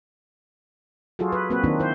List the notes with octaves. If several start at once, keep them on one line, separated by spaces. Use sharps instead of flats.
F#3 F4 F#4 G#4 A4
B4
A#3 C4 F#4 B4
D#3 A#3 C4 D4 D#4 F4
E4 C5